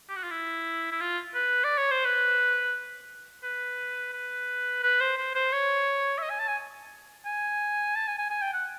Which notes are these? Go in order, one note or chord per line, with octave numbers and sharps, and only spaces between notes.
G4
F#4
F4
E4
E4
F4
B4
D5
C#5
C5
B4
B4
B4
B4
C5
C5
C5
C#5
E5
D#5
G#5
A5
G#5
G#5
A5
G#5
G#5
G#5
G5
F#5